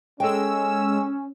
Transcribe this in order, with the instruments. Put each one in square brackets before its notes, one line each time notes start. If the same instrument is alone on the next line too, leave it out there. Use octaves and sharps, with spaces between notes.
[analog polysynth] G#3 E6 [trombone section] C#4 [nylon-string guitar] A4 G5